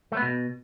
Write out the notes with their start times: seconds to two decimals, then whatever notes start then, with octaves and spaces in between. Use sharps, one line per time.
0.12 A3
0.17 B3
0.22 B2